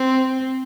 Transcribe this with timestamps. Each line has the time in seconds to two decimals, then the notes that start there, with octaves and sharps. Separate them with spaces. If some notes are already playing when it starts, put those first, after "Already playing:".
Already playing: C4